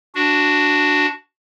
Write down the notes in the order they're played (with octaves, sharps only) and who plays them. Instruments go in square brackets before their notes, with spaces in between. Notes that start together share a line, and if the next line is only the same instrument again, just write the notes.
[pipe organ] D4 F#4